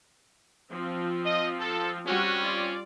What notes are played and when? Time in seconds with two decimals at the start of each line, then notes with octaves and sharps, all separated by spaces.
0.71 F3 C4 F4
1.24 D#5
1.60 A4
2.07 G3 C4 C#4 F#4 F#5
2.42 F4 D5